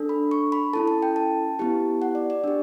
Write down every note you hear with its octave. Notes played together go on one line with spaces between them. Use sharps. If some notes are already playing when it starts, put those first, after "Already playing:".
Already playing: D4 A4
B5
C#6
B5
C#4 E4 A4 A5
A5
G5
A5
B3 E4 G4
F#5
D5
D5
D4 G4